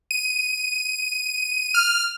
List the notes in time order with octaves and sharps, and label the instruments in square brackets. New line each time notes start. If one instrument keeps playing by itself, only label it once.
[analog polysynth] D#7
F6